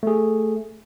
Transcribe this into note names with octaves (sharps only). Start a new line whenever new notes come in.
A3 G#4